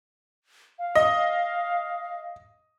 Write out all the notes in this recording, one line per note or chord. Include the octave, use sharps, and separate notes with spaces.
F5
D#5